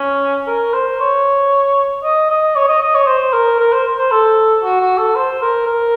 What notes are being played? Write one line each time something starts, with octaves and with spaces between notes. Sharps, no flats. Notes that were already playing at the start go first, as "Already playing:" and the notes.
Already playing: C#4
A#4
C5
C#5
D#5
D#5
C#5
D#5
D#5
C#5
C5
A#4
A#4
C5
C5
A4
F#4
F#4
A4
C5
A#4
A#4